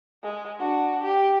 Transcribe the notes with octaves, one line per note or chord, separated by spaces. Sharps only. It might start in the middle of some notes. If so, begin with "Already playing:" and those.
G#3
D4 F#4
G4